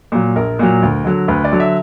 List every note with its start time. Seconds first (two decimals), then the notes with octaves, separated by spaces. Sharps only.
0.12 A#2 F#3
0.36 A#1 A#4
0.59 A#2 F#3
0.82 D2
1.05 D3 F#3
1.28 D2 B4
1.44 D5
1.52 D3 F#3
1.60 E5